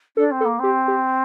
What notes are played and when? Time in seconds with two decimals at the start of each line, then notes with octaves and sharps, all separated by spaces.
0.17 D4 A4
0.31 C4
0.41 A4
0.45 A#3
0.59 C4 G4
0.88 G4